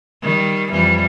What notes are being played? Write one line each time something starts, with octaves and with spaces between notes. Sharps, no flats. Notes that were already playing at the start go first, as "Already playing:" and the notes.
D#3 G3
F2 E3 G3